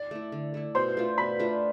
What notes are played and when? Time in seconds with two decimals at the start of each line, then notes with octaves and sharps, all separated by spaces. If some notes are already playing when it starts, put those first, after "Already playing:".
Already playing: D5
0.11 A3 E4
0.32 D3
0.54 A3 E4
0.75 B2 C5 C6
0.97 A3 D4 F4
1.18 B2 B5 B6
1.39 A3 D4 F4